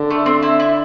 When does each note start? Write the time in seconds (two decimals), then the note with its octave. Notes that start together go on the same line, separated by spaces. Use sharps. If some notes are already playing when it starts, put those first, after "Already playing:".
Already playing: D3
0.10 A3
0.26 C4
0.42 E4
0.60 E4